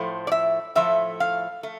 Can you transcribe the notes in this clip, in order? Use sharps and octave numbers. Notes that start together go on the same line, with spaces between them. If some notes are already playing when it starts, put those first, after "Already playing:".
Already playing: A2 F3 A3 C5
D5
E5
A2 F3 A3 E5
F5
A3